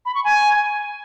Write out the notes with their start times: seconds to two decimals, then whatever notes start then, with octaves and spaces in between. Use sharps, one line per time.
0.06 B5
0.15 C#6
0.24 G#5